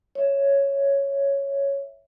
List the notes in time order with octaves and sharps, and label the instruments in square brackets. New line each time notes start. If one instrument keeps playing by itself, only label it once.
[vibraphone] C#5 E5